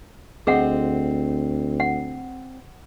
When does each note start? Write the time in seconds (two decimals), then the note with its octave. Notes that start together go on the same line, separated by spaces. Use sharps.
0.47 D2 C4 G#4 C5 D#5 F#5
1.80 F#5